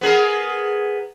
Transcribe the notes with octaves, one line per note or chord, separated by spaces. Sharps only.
B3 G#4 A#4